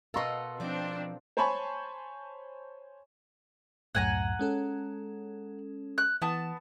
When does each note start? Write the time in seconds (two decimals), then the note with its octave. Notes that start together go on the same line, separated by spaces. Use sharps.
0.14 B2 A4 A#4 D#5 F5 A#5 C6
0.60 F3 C4 D4 D5
1.37 C5 C#5 G#5 A5 B5 C#6
3.95 C#2 F#2 A2 F#5 G#5 A#5
4.39 G#3 C#4 A4
5.98 F#6
6.22 E3 B3 A5